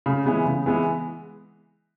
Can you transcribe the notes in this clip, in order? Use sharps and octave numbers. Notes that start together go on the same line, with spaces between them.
C#3
E3 G#3 B3
C#3
E3 G#3 B3